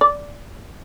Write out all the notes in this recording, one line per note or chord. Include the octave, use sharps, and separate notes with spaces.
D5